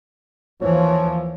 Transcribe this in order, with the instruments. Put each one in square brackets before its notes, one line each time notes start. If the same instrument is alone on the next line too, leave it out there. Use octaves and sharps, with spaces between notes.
[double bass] D#2 E3 [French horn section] F3 [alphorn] C#5